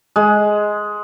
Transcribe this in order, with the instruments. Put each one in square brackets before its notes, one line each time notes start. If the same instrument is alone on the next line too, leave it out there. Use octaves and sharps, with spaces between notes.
[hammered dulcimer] G#3